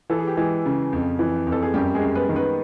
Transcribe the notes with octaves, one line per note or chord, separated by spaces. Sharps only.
E3 A4
G#4
G4
E3 G#3 G#4
C#3
F2
E3
F2
A4
G#4
F#2 G3 G4
G#3 G#4
F#2
B3 B4
D#3
B3 B4